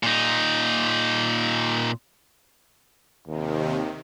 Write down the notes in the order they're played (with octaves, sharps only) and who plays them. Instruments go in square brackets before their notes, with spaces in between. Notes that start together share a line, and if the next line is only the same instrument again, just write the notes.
[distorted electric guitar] A#2 D#4
[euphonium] D#2 [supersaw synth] C3 D#3